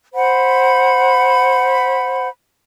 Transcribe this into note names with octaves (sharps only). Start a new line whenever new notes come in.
C5 F#5 B5